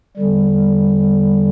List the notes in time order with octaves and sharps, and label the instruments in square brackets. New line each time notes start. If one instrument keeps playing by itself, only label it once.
[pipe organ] E2 D3 G3